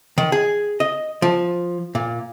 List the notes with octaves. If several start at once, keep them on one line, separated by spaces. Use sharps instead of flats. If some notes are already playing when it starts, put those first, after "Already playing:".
D#3
G#4
D#5
F3
A#2